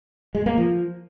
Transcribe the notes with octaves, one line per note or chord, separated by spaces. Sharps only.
G#3
A#3
F3